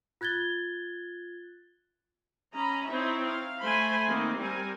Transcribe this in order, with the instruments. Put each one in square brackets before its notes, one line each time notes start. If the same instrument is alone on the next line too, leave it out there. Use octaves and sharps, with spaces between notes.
[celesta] F4 F#6 G#6 A6 G7
[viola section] C#4 D#5 A#5 B5
C4 D#4 E4 C#5 E5
F5
A3 C5 G#5 B5 C6
D#3 A#3 C4
G3 C4 A#4 G#5